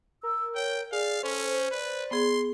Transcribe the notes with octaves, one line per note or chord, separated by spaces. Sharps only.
A#4 E6
C#5 G5
G#4 D5 F5
C#4 A4 C5
B4 D5
B3 G#4 C6